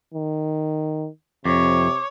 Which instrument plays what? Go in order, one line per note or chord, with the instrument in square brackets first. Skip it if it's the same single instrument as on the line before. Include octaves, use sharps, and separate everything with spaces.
[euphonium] D#3
[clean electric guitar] F2 [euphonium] C3 [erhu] C#5 [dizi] D6